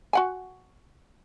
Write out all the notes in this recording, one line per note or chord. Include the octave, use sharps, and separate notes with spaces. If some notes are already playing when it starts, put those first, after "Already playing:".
F#4 F#5 G#5